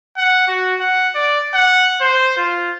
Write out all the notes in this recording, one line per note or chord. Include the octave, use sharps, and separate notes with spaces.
F#5
F#4
F#5
D5
F#5
C5
F4